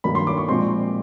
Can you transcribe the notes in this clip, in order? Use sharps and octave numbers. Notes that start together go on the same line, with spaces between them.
G2 D#3 F#3 A#3 B5
C6
D6
C#6
A#2 F3 G#3 C4 C6